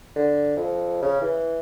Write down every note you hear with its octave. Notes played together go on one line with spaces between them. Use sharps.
D3
F2
C#3
E3